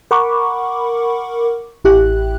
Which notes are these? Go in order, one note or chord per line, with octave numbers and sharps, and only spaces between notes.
A#4 F#5 B5 C#6 D6
A1 E4 G4 F#6